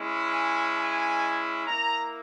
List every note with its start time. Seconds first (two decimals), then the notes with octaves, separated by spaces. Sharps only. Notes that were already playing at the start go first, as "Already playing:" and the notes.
Already playing: G#3 C#4 E4
0.31 G#5
0.76 G#5
1.66 A#3 E4 A#5